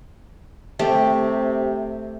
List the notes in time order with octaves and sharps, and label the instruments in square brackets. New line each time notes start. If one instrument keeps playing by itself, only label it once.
[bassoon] C3 [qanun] A3 G4